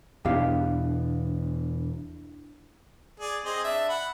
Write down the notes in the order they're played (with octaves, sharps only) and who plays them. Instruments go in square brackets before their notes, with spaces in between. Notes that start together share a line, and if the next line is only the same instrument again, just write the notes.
[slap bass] E2 B2 B3 [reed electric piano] D4 E4 [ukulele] G4 F5
[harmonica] G#4 D5
C4 G#4 D#5
D4 E5
F#5 B5